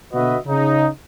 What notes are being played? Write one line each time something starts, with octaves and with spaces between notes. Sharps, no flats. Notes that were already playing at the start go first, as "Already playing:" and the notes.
B2 D3 F#4 B4 D#5 E5
C#3 D#4